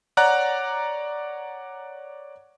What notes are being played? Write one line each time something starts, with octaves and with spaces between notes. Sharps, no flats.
C#5 D5 F#5 A#5 F#6